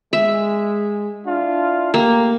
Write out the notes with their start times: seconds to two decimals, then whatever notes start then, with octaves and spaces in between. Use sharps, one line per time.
0.13 G#3 E5
1.25 D4 E4 F4
1.94 A3 A#3 G4